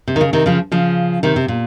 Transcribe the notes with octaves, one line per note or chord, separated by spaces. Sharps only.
C3
D#3
C#3
C3 D#3
C#3 F3
C#3 F3
C3 D#3
C3
A#2